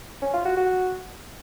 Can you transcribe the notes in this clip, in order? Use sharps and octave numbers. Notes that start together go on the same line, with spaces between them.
C#4
F4
F#4
F#4